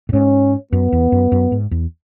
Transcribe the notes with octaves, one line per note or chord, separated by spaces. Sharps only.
A2
G#2 C#4
F#2 B3
E2
F#2
F#2
G#2
E2